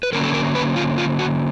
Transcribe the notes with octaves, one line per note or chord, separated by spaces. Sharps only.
B4
D3 F#3 A#3 C#4 A#4
A4
A#4
B4
F4
F4
F#4